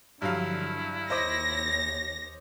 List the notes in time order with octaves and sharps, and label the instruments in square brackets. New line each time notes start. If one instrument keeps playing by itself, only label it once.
[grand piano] G2 F#3 F5 [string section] D3 F3 [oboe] E4
[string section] D#2 C#5 [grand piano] C5 D#5 D6 [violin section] A#6